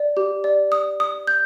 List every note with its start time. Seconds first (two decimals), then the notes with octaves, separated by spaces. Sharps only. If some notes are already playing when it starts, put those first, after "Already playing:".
Already playing: D5
0.17 G4
0.44 D5
0.72 D#6
1.00 D#6
1.27 G6